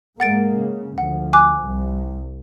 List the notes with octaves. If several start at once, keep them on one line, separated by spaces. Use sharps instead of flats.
G#2 G#3 A#3 F#5 A6 D7
C#3
D2 F3 F#5
G#5 D6 F#6
C2